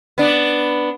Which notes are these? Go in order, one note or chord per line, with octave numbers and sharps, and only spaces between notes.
B3 D4